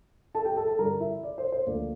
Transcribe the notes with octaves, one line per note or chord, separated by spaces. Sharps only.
A4 A5
G4 G5
A4 A5
A4 A5
G2 D3 G3 D4 A#4 A#5
E4 E5
D5
C5
C5
D2 D3 F3 A#3 D4 D5